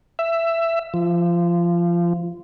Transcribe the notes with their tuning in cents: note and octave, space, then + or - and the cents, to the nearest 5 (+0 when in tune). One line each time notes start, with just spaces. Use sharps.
E5 +15
F3 -20